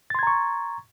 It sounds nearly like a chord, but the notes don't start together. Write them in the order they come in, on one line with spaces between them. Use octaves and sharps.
A6 C6 G#6 A#5 C#6